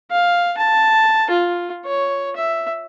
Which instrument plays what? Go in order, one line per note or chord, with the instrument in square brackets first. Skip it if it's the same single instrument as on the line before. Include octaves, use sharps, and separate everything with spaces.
[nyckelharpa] F5
A5
F4
C#5
E5